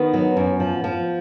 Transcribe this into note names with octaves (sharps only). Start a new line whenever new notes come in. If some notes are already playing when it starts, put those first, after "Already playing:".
Already playing: D#3 B3
F#3
F#2
F3
F3